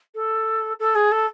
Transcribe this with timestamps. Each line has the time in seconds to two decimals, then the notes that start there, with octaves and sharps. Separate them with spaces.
0.15 A4
0.79 A4
0.95 G#4
1.11 A4